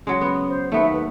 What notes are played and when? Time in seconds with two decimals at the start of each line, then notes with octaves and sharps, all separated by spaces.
0.07 C#3 F#3 G#3
0.21 B3
0.49 C5
0.72 D#2 A3 B3 E5
0.93 B4